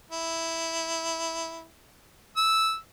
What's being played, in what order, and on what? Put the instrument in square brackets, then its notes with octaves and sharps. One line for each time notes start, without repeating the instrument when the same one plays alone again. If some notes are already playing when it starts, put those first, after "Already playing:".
[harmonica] E4
E6